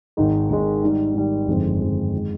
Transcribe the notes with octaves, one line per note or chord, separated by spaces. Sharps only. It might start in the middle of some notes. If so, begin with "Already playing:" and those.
G#1 G#2 D#3 G#3 D#4
G#1 G#2 D#3 G#3 D#4
G#2 D#3 G3
G#2 D#3 G3
G1 F2 D#3 G#3 C4
G1 F2 D#3 G#3 C4
D#3 G#3